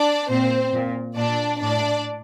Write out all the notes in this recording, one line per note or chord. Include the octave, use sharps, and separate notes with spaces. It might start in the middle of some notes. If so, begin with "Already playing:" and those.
Already playing: D4 D5
A#2 C4 C5
A#2
A#2 D4 D5
A2 D4 D5